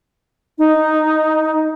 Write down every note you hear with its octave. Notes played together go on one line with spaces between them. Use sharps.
D#4